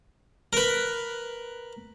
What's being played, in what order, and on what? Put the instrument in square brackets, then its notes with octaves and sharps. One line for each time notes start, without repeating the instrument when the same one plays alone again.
[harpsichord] A#4 B4